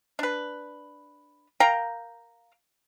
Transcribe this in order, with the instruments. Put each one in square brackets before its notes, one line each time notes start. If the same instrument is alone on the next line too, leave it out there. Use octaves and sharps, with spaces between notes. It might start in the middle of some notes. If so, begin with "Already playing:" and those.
[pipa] D4 B4
A#4 F5 G5 A#5